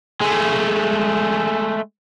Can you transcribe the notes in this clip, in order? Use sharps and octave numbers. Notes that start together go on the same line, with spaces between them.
G#3 A3